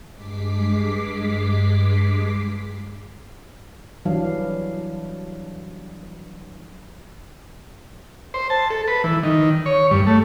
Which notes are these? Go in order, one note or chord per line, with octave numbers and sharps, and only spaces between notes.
G2 G#3 D6 B6 C7
E3 F#3 G3 D4 F5
C5
A5
A4
B4
E3
D#3
C#5
G2
A3